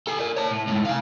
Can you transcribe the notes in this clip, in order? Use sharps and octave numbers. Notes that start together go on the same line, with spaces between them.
A4 G#5
A#4 D5
C#5 A5
A2
A2 G#3
F5 G#5